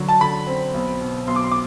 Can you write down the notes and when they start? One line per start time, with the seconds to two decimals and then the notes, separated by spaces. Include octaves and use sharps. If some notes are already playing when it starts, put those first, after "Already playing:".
Already playing: D3 F#3
0.09 A5
0.21 D3 B5
0.47 C4
0.74 B1
1.01 B2
1.27 B1 C6
1.36 D6
1.44 C6
1.52 D6